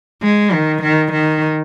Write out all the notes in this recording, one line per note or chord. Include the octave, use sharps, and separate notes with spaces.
G#3
D#3
D#3
D#3